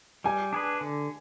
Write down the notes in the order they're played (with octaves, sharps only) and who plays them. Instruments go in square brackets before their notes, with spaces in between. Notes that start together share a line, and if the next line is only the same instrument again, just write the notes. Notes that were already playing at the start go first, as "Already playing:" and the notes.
[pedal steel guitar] G3 [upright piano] G#5
[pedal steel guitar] D4 G#4 B4
D3